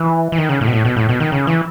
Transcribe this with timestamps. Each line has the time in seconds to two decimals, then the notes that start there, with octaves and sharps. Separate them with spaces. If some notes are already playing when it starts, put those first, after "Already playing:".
Already playing: E3
0.32 E3
0.38 D#3
0.49 C#3
0.61 A2
0.67 B2
0.73 A2
0.85 B2
0.96 A2
1.09 B2
1.20 D#3
1.32 C#3
1.47 E3